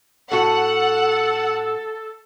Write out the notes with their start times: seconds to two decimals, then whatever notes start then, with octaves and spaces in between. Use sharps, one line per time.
0.32 A2 F#4 A4 F#5